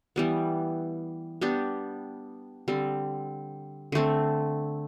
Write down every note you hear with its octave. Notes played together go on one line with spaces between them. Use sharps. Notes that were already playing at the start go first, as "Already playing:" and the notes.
E3 G3 B3
G3 B3 D4 G4
D3 G3 C4
D3 A3 C4